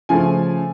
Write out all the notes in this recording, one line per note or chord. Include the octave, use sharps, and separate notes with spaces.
C#3 F3 A3 G#5